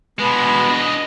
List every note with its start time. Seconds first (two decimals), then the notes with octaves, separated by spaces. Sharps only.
0.19 B2 G#3 B3
0.68 D4 D#5